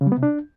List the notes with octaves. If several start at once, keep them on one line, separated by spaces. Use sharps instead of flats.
C#3
G3
B3
C3
D4